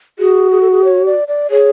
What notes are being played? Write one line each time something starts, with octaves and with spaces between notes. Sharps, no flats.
F#4 G#4
G#4
A4
G#4
C#5
D5
D5
G#4 C#5